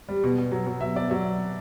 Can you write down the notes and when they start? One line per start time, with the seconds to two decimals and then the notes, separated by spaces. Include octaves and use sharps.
0.09 G3
0.24 B2
0.38 B2
0.52 F#3
0.67 F#3
0.81 B2 E5
0.96 B2 D5
1.10 F#3 E5